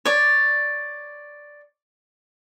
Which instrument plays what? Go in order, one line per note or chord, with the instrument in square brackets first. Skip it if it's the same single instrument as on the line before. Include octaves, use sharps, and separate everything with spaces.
[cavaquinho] C#5 D5